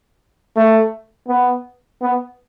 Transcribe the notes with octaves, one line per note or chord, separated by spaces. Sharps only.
A3
B3
B3